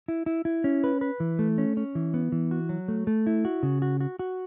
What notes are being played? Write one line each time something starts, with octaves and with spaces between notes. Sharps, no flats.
E4
E4
E4
C#4
B4
B4
E3
A3
C#4
C#4
E3
B3
E3
F#4
F#3
A3
A3
E4
F#4
C#3
F#4
F#4
F#4